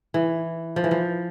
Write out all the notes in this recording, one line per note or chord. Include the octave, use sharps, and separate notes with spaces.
E3
F3
E3
F3